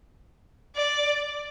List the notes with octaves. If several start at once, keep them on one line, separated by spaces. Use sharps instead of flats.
D5